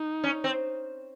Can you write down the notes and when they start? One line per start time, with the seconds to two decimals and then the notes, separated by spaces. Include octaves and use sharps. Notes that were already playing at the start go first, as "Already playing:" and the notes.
Already playing: D#4
0.23 C#4
0.44 C4